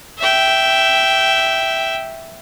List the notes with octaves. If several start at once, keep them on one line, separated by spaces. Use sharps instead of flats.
E5 G5